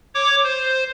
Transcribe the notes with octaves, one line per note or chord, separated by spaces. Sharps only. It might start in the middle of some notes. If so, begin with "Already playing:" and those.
C#5 D6
C5